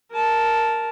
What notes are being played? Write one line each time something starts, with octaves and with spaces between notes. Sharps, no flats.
A#4 A5